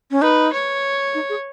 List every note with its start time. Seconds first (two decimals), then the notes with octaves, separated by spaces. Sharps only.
0.11 C#4
0.22 D#4 B4
0.53 C#5
1.14 D#4
1.29 G#4